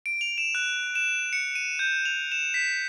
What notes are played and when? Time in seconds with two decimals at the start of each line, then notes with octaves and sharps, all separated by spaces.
0.06 D7
0.21 F7
0.38 E7
0.55 F#6
0.95 E7
1.33 C#7
1.55 D#7
1.79 G6
2.05 F7
2.32 E7
2.54 B6